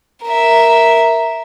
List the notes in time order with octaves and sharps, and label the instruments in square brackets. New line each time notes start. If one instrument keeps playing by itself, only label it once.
[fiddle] A#4 E5